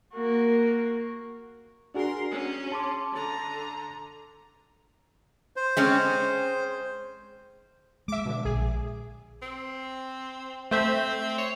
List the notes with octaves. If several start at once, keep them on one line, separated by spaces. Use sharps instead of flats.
A#3 F#4
D4 F#4 G#4 A#4 C6
C#4
A5 C6 D6
D3 A#5
C5
G#3 C4 C#4
G#3 E5 D6
B2 D3
A#1 G#4
C4
A3 C4 C5 E5
C#5